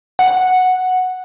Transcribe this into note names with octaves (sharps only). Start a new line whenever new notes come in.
F#5